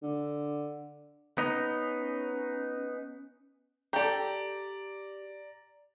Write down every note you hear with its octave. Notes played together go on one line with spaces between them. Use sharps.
D3
B3 C#4 D#4
G4 A4 D5 A#5